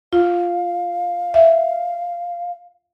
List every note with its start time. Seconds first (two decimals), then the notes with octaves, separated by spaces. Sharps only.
0.13 F4 F5
1.34 E5